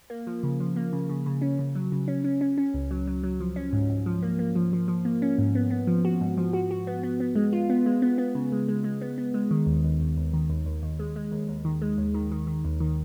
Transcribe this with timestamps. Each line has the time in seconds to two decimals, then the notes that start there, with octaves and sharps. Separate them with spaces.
0.10 A#3
0.27 F3
0.43 C#3
0.60 F3
0.76 A#3
0.93 C#3
1.09 C#3
1.26 C#3
1.42 C#4
1.59 C#3
1.75 F#3
1.92 C#3
2.08 C#4
2.24 C#4
2.41 C#4
2.58 C#4
2.74 C#2
2.91 F#3
3.07 F#3
3.23 F#3
3.40 F3
3.56 C#4
3.73 G#2
3.90 G#2
4.06 F3
4.22 A#3
4.39 A#3
4.55 F3
4.73 F3
4.88 F3
5.05 A#3
5.22 C#4
5.38 G#2
5.55 B3
5.71 B3
5.87 F3
6.05 F#4
6.21 G#2
6.37 F3
6.53 F#4
6.71 F#4
6.87 B3
7.03 B3
7.20 B3
7.36 G#3
7.53 F4
7.70 B3
7.86 G#3
8.02 B3
8.18 B3
8.35 C#3
8.52 G#3
8.68 G#3
8.84 G#3
9.01 B3
9.18 B3
9.34 G#3
9.51 D#3
9.67 D#2
9.83 D#2
10.00 D#2
10.17 D#2
10.33 D#3
10.50 D#2
10.66 D#2
10.83 D#2
10.99 G#3
11.16 G#3
11.32 D#2
11.49 D#2
11.65 D#3
11.82 G#3
11.98 D#2
12.14 D#3
12.32 D#3
12.47 D#3
12.65 D#2
12.80 D#3